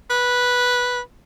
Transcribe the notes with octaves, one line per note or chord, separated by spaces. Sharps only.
B4